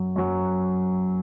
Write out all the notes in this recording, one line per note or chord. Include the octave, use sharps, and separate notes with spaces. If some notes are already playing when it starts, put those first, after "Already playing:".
Already playing: F#2 F#3
F#2 F#3